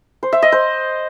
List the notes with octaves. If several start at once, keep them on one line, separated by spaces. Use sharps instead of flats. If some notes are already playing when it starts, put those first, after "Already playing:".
C5
E5
D#5
C5